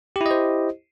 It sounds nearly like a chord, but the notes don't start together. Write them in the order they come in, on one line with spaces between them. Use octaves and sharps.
G4 E4 D#5 C5